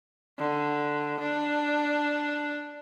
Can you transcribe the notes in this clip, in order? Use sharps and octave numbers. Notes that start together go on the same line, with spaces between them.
D3
D4